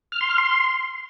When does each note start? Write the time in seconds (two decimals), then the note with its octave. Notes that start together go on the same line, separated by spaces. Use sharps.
0.12 F6
0.21 C6
0.29 F6
0.38 C6